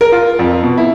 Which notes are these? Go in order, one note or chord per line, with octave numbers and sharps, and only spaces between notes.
A#4
F4
F2
B2
E4